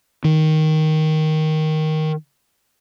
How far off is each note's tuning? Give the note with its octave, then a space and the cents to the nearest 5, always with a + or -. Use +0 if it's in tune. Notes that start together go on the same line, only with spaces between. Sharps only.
D#3 +5